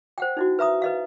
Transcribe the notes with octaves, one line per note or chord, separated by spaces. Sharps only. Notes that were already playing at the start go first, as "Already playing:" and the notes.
C5 F#5 G5
D#4 E4 F#4
B4 E5 A#5 D#6
B4 D#5 F5